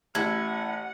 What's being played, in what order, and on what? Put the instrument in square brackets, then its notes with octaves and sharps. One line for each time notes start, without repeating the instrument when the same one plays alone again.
[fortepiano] A1 [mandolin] E4 [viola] F#5 [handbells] G#6